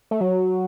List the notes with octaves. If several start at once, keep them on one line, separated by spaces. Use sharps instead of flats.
A3
F#3